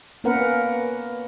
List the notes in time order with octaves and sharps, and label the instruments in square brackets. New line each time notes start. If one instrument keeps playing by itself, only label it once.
[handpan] A#3 B3 C#4 A#4 B4 F#5